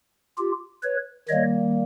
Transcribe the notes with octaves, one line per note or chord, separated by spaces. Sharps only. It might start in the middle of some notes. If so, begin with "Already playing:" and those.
F4 G4
B4 C#5
D#3 G3 A#3 C#5 D#5